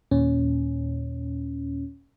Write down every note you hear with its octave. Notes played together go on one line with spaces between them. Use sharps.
D#2 A#2 C#4